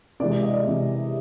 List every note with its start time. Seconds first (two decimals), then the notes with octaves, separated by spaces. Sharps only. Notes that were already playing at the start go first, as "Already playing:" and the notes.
0.20 C3 E3 G#3 D5
0.31 D5
0.43 D#5
0.54 D5
0.65 C3 E3 G#3